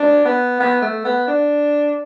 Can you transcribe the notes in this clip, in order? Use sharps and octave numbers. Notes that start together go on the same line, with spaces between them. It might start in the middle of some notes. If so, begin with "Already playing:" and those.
Already playing: D4
B3
B3
A3
B3
D4